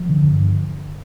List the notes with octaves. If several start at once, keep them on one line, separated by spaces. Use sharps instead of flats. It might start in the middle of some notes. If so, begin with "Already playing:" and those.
Already playing: F3
D3
G2
D3